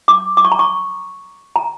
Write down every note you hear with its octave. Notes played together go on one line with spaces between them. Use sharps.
D6
D6
C#6
A#5
C#6
A#5